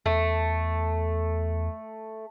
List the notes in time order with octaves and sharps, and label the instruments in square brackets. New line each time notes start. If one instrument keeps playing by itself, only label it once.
[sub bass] E2 [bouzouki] A3